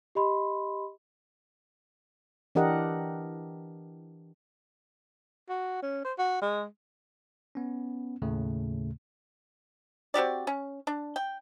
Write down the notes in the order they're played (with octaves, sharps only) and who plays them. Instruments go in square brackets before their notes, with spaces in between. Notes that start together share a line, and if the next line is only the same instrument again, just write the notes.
[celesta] G4 D#5 B5 C6
[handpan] E3 D4 G4 A#4 D#5 F#5
[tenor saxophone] F#4
C#4
C5
F#4
G#3
[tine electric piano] B3 C#4
D#2 A2 C#3 A3
[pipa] C4 F#4 G4 D5
C#4
D4
G5